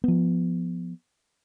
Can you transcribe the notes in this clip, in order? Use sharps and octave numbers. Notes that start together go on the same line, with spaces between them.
F3 B3